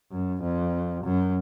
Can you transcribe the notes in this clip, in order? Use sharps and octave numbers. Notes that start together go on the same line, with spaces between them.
F#2
F2
F#2